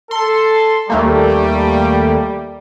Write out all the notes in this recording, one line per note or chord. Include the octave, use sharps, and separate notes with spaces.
A4 C6
D#2 G3 A3 A#3